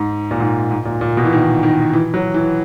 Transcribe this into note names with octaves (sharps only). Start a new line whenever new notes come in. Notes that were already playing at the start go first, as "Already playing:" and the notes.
Already playing: G#2
A#2
G#2
G#2
A#2
A#2
B2
E3
D#3
D#3
E3
F#3
E3